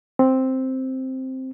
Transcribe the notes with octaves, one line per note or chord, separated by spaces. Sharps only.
C4